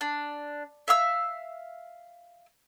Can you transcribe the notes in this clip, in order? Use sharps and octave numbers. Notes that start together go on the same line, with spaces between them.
D4
E5 F5 E6